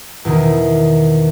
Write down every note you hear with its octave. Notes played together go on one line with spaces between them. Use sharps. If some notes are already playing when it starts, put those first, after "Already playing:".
E2 B2 D#3